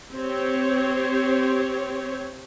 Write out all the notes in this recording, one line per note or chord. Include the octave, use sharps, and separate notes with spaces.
C4 G4 C#5